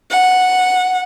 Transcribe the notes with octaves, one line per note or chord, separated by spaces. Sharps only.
F#5